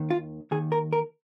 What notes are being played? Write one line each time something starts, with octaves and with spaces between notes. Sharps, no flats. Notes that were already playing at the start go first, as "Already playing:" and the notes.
Already playing: D#2 D#3
F4
D#2 D#3 G#4
A#4
A#4